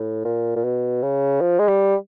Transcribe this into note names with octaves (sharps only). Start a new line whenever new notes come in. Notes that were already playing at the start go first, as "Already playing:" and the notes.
Already playing: A2
A#2
A#2
B2
C#3
F3
G#3
G3